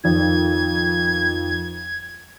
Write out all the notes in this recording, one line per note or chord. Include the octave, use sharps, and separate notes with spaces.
F2 D#3 G#6